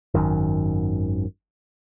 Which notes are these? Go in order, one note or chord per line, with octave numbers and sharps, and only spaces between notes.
G#1 F#2 D#3